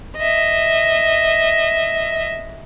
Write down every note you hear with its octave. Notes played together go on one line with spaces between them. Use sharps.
D#5 E5